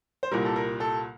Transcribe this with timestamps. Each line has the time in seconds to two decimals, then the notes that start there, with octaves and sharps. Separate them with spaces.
0.23 C5
0.32 C2 A#2 G3 A#4
0.45 A4
0.56 A#4
0.80 A4